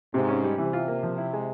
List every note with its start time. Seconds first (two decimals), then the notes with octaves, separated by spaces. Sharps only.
0.14 G#2 C3
0.28 C#4
0.43 G3
0.58 C3 E3
0.73 F4
0.88 A#3
1.03 F3
1.18 E4
1.33 G#3